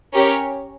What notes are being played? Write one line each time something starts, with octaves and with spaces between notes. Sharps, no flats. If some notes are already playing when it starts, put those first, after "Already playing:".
C#4 G4 A#4 C#5